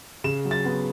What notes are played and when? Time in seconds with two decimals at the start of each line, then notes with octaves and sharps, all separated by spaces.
0.24 C#3 E7
0.45 F#3
0.51 A6
0.65 B3